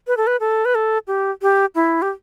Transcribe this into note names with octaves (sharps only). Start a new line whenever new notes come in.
B4
A4
B4
A4
B4
A4
G4
G4
E4
G4